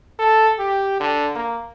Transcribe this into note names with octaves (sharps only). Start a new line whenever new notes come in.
A4
G4
D3
A#3